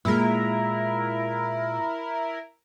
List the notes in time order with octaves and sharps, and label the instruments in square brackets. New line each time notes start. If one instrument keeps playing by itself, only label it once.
[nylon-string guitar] A#2 G#3 [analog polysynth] E4 A#4